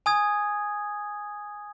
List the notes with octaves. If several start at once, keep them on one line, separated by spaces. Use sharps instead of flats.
G#5 D#6 G#6